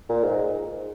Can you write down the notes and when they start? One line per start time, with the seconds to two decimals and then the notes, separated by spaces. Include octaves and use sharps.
0.09 A#2
0.24 G#2